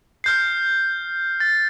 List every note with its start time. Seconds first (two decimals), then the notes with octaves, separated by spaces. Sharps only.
0.24 F6 G6 C7
1.40 A6